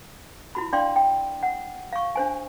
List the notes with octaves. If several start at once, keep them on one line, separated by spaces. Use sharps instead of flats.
E4 F#4 B5
D4 D5 F5 G5 C6
G5
F#5
F5 C#6
D4 C5 G#5